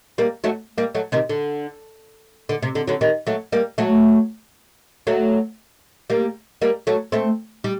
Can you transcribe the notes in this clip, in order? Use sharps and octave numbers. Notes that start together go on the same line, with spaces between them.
G3 A#3
F#3 A3
G3 A#3
F#3 A3
C3 D#3
D3
D3
C3
D3
D3 F#3
D#3 G3
F#3 A3
G3 A#3
F#3 A3
F#3 A3
G3 A#3
G3 A#3
F#3 A3
A3 C4
G3